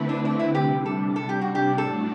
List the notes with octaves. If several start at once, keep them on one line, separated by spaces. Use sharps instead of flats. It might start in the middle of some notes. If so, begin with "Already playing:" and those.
Already playing: D3 A3 C4 E4 B4
D4
D4
E4
C3 G3 D4 G4
A4
A4
G4
F#4
G4
A2 F#3 A3 D4 A4